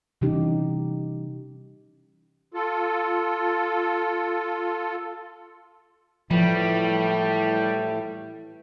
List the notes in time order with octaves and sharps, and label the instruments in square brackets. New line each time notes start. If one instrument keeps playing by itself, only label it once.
[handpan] C3 E3 G3 C#4 D#4 G4
[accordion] F4 A4
[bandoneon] A2 A3 [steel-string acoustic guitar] E3 [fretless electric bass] F3 [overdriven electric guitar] G3